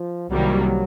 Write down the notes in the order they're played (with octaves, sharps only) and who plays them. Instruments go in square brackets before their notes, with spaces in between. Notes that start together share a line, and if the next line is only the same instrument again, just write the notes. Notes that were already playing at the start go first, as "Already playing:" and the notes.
Already playing: [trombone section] F3
[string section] C2 C3 D#3 G3 A#3 [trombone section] F#3